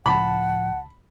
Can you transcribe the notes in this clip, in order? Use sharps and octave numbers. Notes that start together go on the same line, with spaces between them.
C#2 A2 F3 F#5 A5 B5